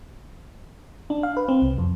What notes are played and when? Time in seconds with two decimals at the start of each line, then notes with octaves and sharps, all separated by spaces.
1.10 D4
1.23 F5
1.37 B4
1.48 C4
1.62 C2
1.78 F2